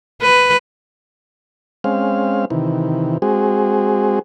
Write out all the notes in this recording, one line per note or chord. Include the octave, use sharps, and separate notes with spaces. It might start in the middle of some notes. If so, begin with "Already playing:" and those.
B4
G#3 C4 C#4 F5
C3 D#3 E3
G#3 C4 F#4 G#4